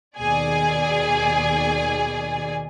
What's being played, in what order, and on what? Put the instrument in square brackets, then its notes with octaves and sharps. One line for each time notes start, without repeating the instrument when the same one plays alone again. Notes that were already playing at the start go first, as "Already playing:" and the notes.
[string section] D#2 B2 G#4 D5 G#5